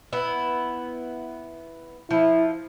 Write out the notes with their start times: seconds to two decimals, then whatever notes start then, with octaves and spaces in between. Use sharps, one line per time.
0.13 B3 E4
2.11 F3 E4